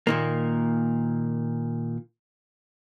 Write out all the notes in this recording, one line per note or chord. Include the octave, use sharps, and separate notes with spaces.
A#2 D#3 A#3